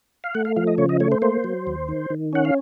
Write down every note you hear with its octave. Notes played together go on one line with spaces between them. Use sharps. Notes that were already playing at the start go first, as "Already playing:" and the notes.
F5
A3 F#5
F5
F3 F5
D#5
C#3 C#5
D#5
A3 C#5
C5
A#3 C5
F#3
D#2
D#3
D#3
C#4 F#5
F5